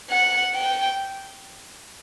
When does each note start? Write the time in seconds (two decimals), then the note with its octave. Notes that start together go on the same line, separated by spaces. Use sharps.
0.10 F#5
0.54 G5